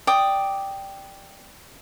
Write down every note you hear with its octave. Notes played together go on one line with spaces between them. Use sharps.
D5 G5 D6 D#6